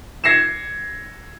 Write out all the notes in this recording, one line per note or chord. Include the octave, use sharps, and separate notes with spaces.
G#6 A#6 C7 C#7 E7